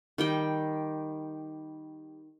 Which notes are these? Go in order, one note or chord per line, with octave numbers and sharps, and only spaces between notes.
D#3 G3 G5